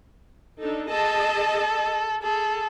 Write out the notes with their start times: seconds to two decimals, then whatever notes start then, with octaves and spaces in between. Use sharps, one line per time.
0.61 D4 D#4 A4
0.90 G#4 A4 D#5 A5
2.22 G#4 A4